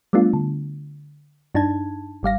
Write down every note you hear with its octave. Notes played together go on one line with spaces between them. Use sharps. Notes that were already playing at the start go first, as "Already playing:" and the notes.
G3 A3 B3 D4 F4
D3
G2 D4 D#4 A5 G#6
G#1 G3 F5 A#6